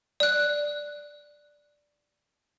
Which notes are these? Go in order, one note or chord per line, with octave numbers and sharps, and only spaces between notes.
D5 F#6